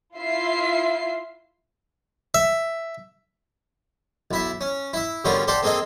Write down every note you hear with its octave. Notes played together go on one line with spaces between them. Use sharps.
E4 F4 E5 C7
E5
B1 E4 E5
C#4
E4 E5
B2 D3 G3 C#4 F4 A#4
G4 A4 C5 D5 F#5
A#3 C4 G#4 A4 D#5